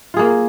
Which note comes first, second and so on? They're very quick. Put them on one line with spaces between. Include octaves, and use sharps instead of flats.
F4 G#4 A#3